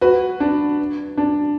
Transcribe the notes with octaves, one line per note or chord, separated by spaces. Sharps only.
F#4 B4
D4
D4